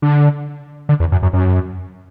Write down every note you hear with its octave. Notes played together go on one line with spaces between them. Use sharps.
D3
D3
E2
F#2
F#2
F#2